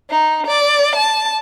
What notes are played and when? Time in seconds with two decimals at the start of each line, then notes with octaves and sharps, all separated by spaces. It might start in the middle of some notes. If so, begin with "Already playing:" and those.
0.10 D#4
0.47 D5
0.96 A5